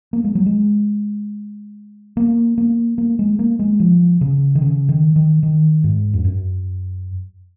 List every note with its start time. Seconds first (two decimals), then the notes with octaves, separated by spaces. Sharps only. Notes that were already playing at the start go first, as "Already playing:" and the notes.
0.13 A#3
0.24 G#3
0.35 F#3
0.46 G#3
2.17 A#3
2.58 A#3
2.98 A#3
3.19 G#3
3.39 A#3
3.59 G#3
3.80 F3
4.21 C#3
4.55 D#3
4.62 C#3
4.89 D#3
5.16 D#3
5.43 D#3
5.84 G#2
6.14 F2
6.24 F#2